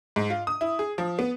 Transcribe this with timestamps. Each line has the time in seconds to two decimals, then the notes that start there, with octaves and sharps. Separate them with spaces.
0.16 G#2
0.30 F4
0.47 D#6
0.61 E4
0.79 G#4
0.98 F3
1.19 B3